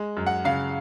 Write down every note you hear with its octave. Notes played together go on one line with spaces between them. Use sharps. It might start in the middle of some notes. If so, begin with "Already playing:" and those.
Already playing: G#3
F#2
F#5
C#3 F5